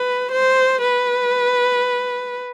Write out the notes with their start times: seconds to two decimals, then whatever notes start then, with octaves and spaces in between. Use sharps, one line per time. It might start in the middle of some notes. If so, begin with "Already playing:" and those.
Already playing: B4
0.32 C5
0.82 B4